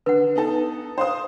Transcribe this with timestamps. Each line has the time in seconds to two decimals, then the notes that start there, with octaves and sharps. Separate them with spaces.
0.06 D3 B4 F#5
0.35 B3 D#4 A4
0.98 C5 F5 D#6